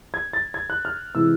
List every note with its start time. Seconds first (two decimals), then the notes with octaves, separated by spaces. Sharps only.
0.14 G#6
0.33 A6
0.54 G#6
0.70 F#6
0.85 F6
1.15 C3 E3 G#3 E6